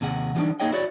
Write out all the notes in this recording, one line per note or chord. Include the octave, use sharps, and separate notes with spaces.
D#2 C3 G#4 F#5
E3 F3 G3 A#3 D4 D#4
A#3 D#4 G#4 C#5 D#5 G5
E4 F#4 C#5 D5